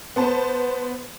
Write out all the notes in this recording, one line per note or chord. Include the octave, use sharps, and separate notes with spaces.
B3 C5 A5